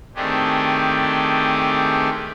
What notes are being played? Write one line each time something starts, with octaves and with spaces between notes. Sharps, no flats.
D#3 A3 C4 D4 G4 G#4